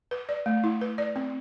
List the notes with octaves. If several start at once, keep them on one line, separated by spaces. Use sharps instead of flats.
B4
D5
A3
E4
B4
D5
C4